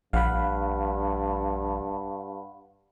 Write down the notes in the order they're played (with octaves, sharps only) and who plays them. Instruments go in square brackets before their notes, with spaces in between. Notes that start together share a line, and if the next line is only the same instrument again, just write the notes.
[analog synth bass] A#1 [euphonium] G2 [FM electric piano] F5 F#5 B5